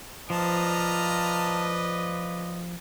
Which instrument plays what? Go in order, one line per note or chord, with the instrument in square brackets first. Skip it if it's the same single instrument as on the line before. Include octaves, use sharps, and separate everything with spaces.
[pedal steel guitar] F3 [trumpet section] B4 D5 D#5 [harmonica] A5 A#5 F6